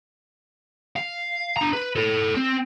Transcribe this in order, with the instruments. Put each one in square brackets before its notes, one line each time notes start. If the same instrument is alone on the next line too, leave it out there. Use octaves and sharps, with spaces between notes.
[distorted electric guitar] F5
D4 A#5
B4
A4 C#5
C4